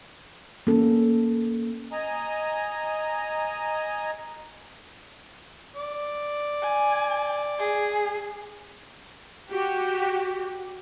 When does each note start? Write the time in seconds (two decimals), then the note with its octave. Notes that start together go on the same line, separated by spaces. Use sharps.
0.67 A#3 C#4 A4
1.92 D#5 G#5 A#5
5.76 D5
6.62 G#5
7.59 G#4
9.50 F#4 G4